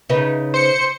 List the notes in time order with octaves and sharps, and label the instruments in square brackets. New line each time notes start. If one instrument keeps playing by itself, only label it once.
[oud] C#3 D#4 B4
[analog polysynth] C5 C#7